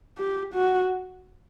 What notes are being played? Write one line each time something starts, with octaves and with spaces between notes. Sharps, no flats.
G4
F#4